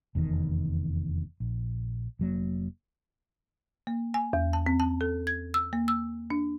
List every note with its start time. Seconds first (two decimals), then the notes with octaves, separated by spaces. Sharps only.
0.15 F1 E2 A#2 D#3
1.40 A#1
2.19 F1 F#3 A#3
3.87 A#3
4.14 G#5
4.33 E2
4.53 A5
4.66 C4
4.80 A5
5.01 A4
5.27 G#6
5.54 E6
5.73 A#3
5.88 E6
6.30 D4